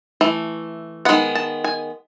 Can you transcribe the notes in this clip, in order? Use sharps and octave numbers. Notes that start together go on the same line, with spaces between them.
E3 A3
D#3 G#3 B3 F#5
A5
G#5